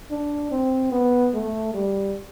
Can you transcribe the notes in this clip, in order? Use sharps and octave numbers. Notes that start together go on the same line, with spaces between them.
D4
C4
B3
A3
G3